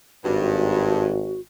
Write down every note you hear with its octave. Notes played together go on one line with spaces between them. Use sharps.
G#1 G2 F#4